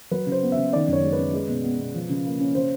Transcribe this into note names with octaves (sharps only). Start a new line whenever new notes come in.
F#3 B4
C#3
C5
B3
E5
C#3
D#3 D5
F#2 C#5
G#3
B4
C#4
G#3
B2
B3
B2
F3
C#3
A#3
C#4
C#3 C5